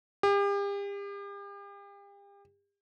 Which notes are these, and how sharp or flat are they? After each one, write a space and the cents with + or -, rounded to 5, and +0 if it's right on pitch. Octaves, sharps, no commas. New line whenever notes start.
G4 +40